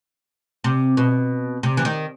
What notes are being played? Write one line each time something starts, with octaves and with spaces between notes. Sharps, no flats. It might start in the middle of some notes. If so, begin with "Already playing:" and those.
C3
B2
C3
E3
D#3